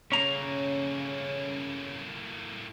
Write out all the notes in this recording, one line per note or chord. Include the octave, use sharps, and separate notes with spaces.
A2 C#3 A#3 C#4 A#5